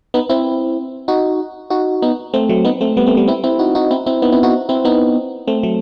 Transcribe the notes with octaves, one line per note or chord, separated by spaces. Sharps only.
B3 D#4
C4 E4
D#4 F#4
D#4 F#4
B3 D#4
A3 C4
F#3 A3
B3 D#4
A3 C4
G3 B3
A3 C4
G3 B3
C4 E4
C4 E4
D#4 F#4
D#4 F#4
C4 E4
C4 E4
B3 D#4
C4 E4
D#4 F#4
C4 E4
B3 D#4
A3 C4
F#3 A3